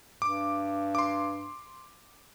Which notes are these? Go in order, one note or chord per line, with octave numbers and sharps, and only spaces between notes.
G2 D6
C6 D6